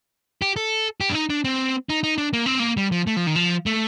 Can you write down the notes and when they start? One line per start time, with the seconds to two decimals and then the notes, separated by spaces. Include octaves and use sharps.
0.42 G4
0.56 A4
1.01 G4
1.09 D4
1.15 D#4
1.30 D4
1.44 C4
1.89 D#4
2.03 D#4
2.18 D4
2.33 A#3
2.46 C4
2.59 A#3
2.77 G3
2.91 F3
3.07 A3
3.16 F3
3.27 D#3
3.36 F3
3.66 A3